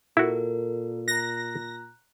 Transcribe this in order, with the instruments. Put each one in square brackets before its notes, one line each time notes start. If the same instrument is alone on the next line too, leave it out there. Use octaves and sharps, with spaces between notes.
[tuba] A#2 [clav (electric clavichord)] E4 F#4 [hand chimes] A4 A#4
[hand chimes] A#5 F#6 [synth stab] A#6